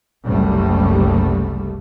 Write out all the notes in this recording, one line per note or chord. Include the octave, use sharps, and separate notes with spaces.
F#1 C2 G3 A3